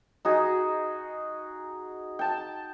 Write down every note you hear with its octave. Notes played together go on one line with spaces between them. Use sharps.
D#4 F#4 G#4
G5 A5